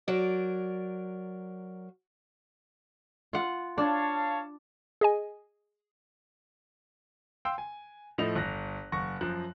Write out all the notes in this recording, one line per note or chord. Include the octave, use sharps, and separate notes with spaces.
F#3 A#4 D5
F4 F#5
D4 C#5 F5 A5
G#4 D#5 G#5
F5 G5 C6 E6
G#5
A2 F3 A3 D#5 F7
G1 F#6 A#6
F#1 F#5 C#6 A#6
F#2 F3 F#6